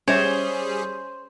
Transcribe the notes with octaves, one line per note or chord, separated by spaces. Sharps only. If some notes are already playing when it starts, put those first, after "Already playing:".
G3 C#4 G#4 C5 C#5 E5